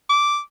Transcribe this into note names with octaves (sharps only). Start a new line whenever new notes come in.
D6